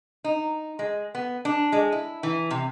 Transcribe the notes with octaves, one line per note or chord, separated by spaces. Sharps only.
D#4
G#3
B3
D4
G#3
E4
E3
C3